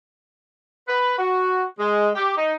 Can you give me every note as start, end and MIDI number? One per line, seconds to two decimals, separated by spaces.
0.88 1.14 71
1.18 1.64 66
1.79 2.09 56
2.15 2.36 67
2.37 2.55 63